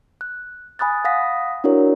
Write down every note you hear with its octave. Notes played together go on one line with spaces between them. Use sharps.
F#6
G#5 B5 D#6 F#6 A6
F5 F#5 D#6 A#6 B6
D4 E4 F#4 A#4 C#5